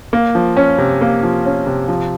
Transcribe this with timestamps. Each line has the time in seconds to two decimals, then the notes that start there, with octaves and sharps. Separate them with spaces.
0.13 A#3
0.35 F3
0.57 C#4
0.78 C3
1.01 A#3
1.23 F3
1.45 C#4
1.67 C3
1.88 F3